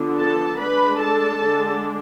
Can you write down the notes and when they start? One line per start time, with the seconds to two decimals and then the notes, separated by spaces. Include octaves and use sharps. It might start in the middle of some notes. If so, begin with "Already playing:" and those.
Already playing: D3 F3 B3 D4
0.18 A4 A5
0.59 G#3 D4 B4 B5
1.00 A4 A5
1.40 D3 G#3 D4